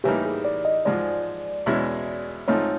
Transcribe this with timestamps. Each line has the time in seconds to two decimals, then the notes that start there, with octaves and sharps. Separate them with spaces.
0.04 A2 E3 G3 A#3 D#4 G4
0.25 G#4
0.44 D5
0.65 D#5
0.85 G#2 F3 G#3 D5
1.66 E2 B2 G#3 C#4 E4
2.48 G#2 F3 A3 C4 D#4 C#5